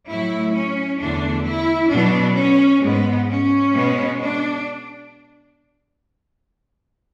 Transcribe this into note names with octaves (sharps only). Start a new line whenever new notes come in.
A2 F#3 A3 E4
C#4
E2 D3 A3 D4
E4
B2 F#3 B3 D4
C#4
G#2 G#3 B3
C#4
B2 G#3 B3
D4